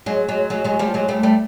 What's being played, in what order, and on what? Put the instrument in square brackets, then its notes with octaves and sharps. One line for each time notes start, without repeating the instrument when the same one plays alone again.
[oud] F#3 G#3
F#3 G#3
F#3 G#3
F#3 G#3
F3 G3
F#3 G#3
G3 A3
G3 A3